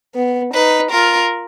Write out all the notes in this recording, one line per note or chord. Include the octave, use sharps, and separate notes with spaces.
B3
D#4 B4
F4 A#4